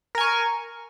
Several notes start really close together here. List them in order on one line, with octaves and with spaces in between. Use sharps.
A#4 G#5 C#6